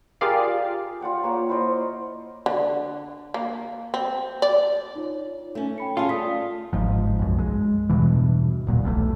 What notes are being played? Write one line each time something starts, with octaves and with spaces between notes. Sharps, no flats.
F4 G4 G#4 A#4 D5 F5
F4 D5 F#5 G5
A#3 C#5 F#5
E4 C5 D5 D#5
D3
A#3
C4
D5
D#4 F4 C#5
A3 C#4
G5 B5 C#7
C#4 F4 G#4 A5
A3 D5 D#6 B6
G1 G#2 F3
B1 F#2
G#3
E2 G2 B2 E3
D1 A#2 F#3
B1 E2 G#3 A3